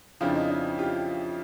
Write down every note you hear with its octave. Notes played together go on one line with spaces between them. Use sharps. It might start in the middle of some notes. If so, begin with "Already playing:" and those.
F2 C#3 F3 D4 E4
D#4
D#4
F4 G4